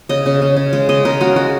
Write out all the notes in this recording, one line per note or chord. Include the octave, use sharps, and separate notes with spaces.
C#3 D#5
C#3
C#3
C#3
G#3
C#3 D#5
C#3 A#4
G#3 F#4
G#3 F#4